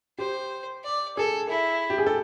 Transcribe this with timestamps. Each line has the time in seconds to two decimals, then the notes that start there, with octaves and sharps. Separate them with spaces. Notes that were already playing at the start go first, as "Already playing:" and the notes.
0.18 G4 C5
0.84 D5
1.17 G#4 A4
1.49 E4
1.90 G4
1.98 G#4
2.06 A4